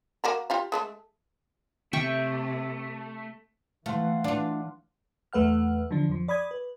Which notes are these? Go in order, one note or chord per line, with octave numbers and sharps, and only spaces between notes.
A#3 F#4 A#4
F4 G4 F5
G#3 A3 A4
C3 A3 E5 G5 C#6
E3 A3 F5 F#5 C6
D4 F4
E2 A3 B4 F#5 F6
D3 E3 F3 D4
F2 F3
D5 B5 D#6 G#6
B4